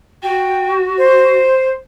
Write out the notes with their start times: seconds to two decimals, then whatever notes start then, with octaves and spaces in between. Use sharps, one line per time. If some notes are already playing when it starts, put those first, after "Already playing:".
0.22 F#4 G5
0.97 C5